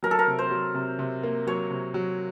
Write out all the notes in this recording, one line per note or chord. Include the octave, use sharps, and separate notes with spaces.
F#3 A#4
A4
A#4
C3
C5
F#3
C3
C3
A#3
F#3 C#5
C3
F#3